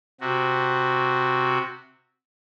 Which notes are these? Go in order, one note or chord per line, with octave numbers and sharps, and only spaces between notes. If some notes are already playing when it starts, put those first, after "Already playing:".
C3 F#4